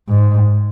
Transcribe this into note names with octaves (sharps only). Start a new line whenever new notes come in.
G#2